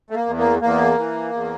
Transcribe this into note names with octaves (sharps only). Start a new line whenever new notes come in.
A3
A#3
E2
A#3
E2 A#3
E3
E2